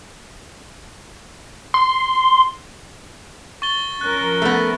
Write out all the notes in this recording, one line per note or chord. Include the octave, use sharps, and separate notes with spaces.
C6
C#6 A6 G7
F3 C#4 A#4 F#6
A3 B3